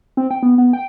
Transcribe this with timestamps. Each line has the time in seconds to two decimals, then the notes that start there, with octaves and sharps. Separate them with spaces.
0.17 C4
0.31 G5
0.43 B3
0.58 B3
0.73 G5